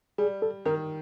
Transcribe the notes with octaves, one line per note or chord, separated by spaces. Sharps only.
G3 G#4
A4
D#3 A#4